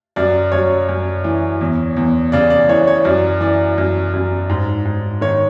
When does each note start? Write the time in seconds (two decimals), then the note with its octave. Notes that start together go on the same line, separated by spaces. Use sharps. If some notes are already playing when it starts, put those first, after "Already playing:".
0.16 F#2 D5
0.52 F#2 C#5
0.89 F#2
1.24 E3
1.61 E2
1.97 E2
2.32 C#3 D5
2.50 D5
2.69 E3 C#5
2.87 C#5
3.04 F#2 D5
3.40 E3 D5
3.78 F#2
4.13 F#2
4.50 G#2
4.85 G#2
5.21 D#3 C#5